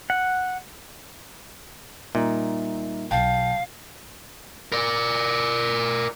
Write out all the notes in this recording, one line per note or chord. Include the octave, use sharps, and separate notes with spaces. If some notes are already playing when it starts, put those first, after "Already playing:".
F#5
A#2 G3 D#4 E5
B1 F5 G5 A5 G6
A#4 D5